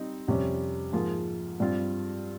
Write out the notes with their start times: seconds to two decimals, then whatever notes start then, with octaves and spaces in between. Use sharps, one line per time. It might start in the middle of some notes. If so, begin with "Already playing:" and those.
Already playing: G3 C4 D#4
0.28 F2 C3 G3 C#4
0.93 G#2 F3 A#3 F4 G#4
1.60 G2 G3 C4 F4